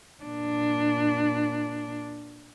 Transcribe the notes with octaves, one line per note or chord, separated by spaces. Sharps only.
A#2 D4